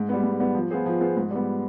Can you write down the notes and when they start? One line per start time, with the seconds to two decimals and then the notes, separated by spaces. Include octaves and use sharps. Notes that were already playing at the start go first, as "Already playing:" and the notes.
Already playing: G#2
0.09 G3 B3
0.24 G#2
0.40 G3 B3
0.55 F3
0.70 B3 F4 G#4 C5
0.86 F3
1.01 B3 F4 G#4 C5
1.17 G#2
1.31 G3 B3